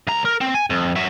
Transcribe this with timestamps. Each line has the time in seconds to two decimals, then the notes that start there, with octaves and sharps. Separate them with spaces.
0.07 C#2 A#5
0.25 A#4
0.41 C4
0.54 G#5
0.70 F2
0.96 F#3 E5